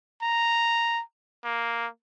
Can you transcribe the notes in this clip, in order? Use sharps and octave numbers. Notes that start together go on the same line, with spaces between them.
A#5
A#3